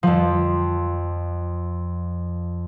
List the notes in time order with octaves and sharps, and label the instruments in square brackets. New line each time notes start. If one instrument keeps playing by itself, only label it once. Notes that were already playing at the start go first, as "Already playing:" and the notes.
[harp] F2 F3